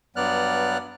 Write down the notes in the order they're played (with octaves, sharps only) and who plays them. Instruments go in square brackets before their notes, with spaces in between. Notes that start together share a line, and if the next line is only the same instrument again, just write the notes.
[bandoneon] G2 F#3 B3 D5 F6 F#6